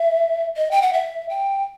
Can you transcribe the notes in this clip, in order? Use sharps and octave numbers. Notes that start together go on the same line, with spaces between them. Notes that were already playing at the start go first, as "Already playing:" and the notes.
Already playing: E5
D#5
G5
F#5
E5
G5